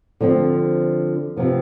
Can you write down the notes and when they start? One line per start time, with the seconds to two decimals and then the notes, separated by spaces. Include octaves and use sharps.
0.21 D3 F3 C4
1.37 C3 F3 B3